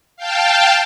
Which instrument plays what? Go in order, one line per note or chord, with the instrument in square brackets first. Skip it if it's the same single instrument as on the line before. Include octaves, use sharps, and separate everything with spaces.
[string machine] F5 G5 A5